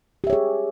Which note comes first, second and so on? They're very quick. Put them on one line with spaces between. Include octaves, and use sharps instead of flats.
G4 E5 C#5 G#4